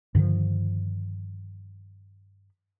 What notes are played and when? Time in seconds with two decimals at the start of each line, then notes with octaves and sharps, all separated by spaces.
0.15 G2 D3 D#3 F3